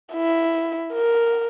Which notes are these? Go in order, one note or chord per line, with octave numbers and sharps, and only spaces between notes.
E4
A#4